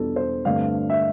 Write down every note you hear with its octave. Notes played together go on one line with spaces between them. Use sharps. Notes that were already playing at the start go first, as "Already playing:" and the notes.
Already playing: E2 B2 G3 D4 F4 A4
C5
G2 D3 A3 C4 F5
E5